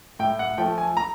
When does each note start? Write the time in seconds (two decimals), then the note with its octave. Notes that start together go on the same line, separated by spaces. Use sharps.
0.19 A2 G5
0.39 F#5
0.58 F3 A3 G5
0.78 G#5
0.97 A#5